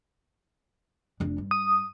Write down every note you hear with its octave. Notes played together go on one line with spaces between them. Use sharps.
F1 D4
G2
D#6